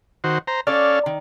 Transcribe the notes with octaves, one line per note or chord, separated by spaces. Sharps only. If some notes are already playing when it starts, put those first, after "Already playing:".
D#3 F#4 C5
C5 A#5
C#4 A4 D5 F5
D#3